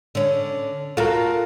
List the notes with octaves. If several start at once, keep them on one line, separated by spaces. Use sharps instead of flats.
D3 C#4
F4 F#4 A4 A#4